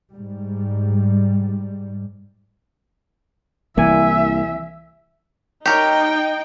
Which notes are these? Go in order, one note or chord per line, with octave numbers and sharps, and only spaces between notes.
G#2 G3
C2 E3 A#3 D5 E5 G#5
D#4 G4 A#4 C#5 G5